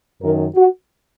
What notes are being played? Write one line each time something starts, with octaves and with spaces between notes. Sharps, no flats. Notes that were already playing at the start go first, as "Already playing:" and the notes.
F#2 D#3 A#4
F#4